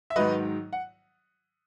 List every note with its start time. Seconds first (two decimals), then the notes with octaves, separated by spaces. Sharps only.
0.10 E5
0.16 G#2 D#3 F#3 B4 D#5
0.73 F#5